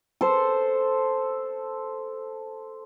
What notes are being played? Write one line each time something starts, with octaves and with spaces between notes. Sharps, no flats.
A4 C5